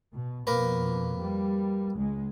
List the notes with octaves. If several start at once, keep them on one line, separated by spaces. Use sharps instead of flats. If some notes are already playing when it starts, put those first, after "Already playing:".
B2
F2 B2 A#3 A#4 B4
G3
C#2 G#3